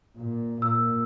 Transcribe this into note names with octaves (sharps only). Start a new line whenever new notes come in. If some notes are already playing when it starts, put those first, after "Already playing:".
A#2
A#2 E6